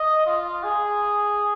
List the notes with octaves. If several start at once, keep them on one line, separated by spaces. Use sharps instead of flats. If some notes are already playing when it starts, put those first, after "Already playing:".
Already playing: D#5
F4
G#4